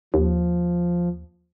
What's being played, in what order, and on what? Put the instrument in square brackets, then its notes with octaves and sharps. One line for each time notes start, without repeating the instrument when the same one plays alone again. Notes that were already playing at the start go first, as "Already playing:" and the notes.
[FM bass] D#2 [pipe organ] F3